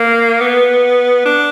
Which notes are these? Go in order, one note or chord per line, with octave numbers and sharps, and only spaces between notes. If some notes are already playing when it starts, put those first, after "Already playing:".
Already playing: A#3
B3
D4